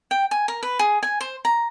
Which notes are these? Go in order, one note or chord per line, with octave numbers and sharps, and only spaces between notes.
G5
G#5
A#4
B4
G#4
G#5
C5
A#5